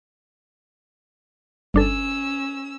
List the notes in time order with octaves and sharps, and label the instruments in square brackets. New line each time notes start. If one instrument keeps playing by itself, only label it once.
[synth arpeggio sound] G1 D4 A4 [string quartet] C#4 E6